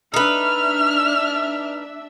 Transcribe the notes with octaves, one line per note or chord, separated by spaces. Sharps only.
D4 D#4 B4 E5 F6